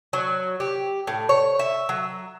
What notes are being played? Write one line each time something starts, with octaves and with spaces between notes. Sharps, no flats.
F#3
G4
A2
C#5
E5
F#3